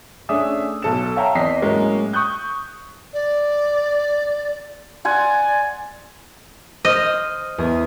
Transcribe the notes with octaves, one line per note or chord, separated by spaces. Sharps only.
A3 C#4 D4 G#4 E5 D#6
B1 A4 E7
C#5 E5 F5 G5 A5 A#5
E2 C4 D#5 B6 C7
A2 F#3 G#3 A#3 C#4
C#6 D#6 F#6 G6
D5
D5 F#5 G#5 C6
C5 D#5 D#6 F6
E2 G#4 D#6